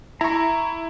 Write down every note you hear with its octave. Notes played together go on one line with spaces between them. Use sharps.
E4 A#5 C#6